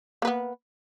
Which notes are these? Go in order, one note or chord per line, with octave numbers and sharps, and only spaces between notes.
A#3 B3 B4